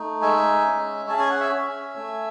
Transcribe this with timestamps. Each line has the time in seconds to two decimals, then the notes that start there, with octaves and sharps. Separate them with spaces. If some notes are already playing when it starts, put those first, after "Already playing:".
Already playing: A3 D#4
0.22 G#3 E5 G#5
0.66 C#4
1.09 G#4 A5
1.19 G#5
1.30 F#5
1.40 E5 G#5
1.53 C#4
1.96 A3